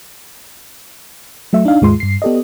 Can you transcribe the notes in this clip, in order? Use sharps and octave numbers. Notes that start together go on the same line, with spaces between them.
F#3 A3 E5
D4 D#4 F5
D#2 G#2 G#3 F4 C6
G2 C7
B3 G4 A4 D5 D#5